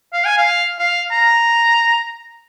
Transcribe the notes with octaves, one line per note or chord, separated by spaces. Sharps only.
F5
G#5
F5
F5
A#5